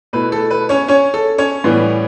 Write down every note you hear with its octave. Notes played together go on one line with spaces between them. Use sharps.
B2 A3 E4 B4
A4
B4
C#4 C#5
C#4 C#5
A4
C#4 C#5
A2 E3 G3 B3